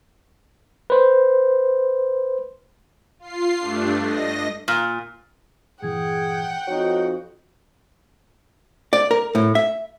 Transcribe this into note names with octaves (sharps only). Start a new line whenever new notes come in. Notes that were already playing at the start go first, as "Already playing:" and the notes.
B4 C5
F4 C7
G2 A3 D4
D#5 A#6
A#2
G2 A#2 E3 G#4 F#5 G5
F2 D#4 F#4 C#5
D5
A#4
A2
E5